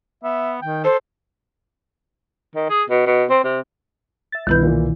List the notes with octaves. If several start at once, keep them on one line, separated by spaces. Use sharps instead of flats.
B3 E5
D#3 G5
A4 C5
D#3
G#4
B2
B2
C4
C3
E5 A6
G1 C2 B2 D#3 E4 B4 G6
A#2 E3